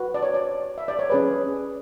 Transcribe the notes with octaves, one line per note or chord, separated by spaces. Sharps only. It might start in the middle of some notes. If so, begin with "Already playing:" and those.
Already playing: F#4 B4
D5
C#5
D5
E5
D5
C#5
C#4 G#4 B4 D5